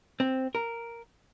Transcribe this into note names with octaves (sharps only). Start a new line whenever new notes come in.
C4
A#4